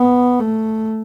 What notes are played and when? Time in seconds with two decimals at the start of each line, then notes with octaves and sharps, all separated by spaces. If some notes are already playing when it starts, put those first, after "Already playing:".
Already playing: B3
0.39 A3